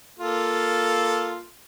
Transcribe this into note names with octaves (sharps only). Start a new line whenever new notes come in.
A#3 F4 A4